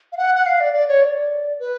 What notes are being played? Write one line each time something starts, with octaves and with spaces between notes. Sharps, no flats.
F5
F#5
F#5
F5
D5
D5
C#5
D5
B4